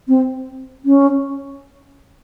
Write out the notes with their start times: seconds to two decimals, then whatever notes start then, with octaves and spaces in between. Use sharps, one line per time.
0.08 C4
0.85 C#4